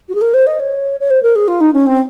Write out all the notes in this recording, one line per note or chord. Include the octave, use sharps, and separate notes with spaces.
F#4
G#4
A#4
C5
D#5
C#5
C#5
C5
A#4
G#4
F4
D#4
C#4
C4